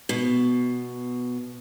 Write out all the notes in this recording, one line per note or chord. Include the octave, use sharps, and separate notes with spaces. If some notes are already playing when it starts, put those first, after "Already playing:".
B2